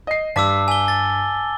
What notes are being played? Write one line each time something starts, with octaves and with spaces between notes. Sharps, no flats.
D#5 C7
G2 A5 D6 E6 B6
G#5 G7
A6